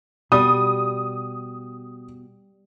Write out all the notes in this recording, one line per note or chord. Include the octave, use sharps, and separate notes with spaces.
B2 G3 D#6